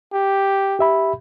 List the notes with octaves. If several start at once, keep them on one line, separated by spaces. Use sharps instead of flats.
G4
G4 E5 B5